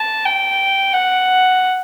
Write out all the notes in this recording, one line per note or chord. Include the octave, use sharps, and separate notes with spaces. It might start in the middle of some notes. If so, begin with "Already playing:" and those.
Already playing: A5
G5
F#5